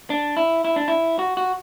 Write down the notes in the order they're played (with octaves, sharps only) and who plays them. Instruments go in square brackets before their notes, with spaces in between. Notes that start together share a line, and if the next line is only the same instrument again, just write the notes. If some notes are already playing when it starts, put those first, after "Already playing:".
[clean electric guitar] D4
E4
E4
D4
E4
F#4
F#4